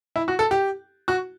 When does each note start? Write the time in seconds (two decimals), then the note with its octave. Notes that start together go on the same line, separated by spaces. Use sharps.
0.16 E4
0.28 F#4
0.39 A4
0.51 G4
1.08 F#4